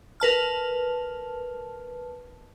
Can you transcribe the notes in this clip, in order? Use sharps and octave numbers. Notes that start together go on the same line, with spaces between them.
A#4 B4 A5 F6